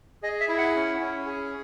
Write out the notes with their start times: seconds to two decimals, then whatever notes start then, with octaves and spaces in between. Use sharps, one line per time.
0.23 G#4 D#5
0.40 E5
0.49 E4
0.58 F#5
0.75 C#4
1.00 C#4
1.26 G#4